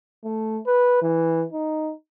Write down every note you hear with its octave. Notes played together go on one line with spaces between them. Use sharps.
A3
B4
E3
D#4